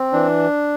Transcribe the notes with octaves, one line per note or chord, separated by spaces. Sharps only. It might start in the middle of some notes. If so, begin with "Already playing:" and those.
Already playing: C4
E3 D4